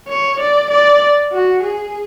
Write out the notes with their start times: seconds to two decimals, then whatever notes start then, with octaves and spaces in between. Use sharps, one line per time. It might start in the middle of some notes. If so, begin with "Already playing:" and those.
0.09 C#5
0.40 D5
0.71 D5
1.33 F#4
1.63 G#4